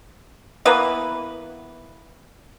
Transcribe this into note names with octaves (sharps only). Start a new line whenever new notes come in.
E3 A#3 B3 B4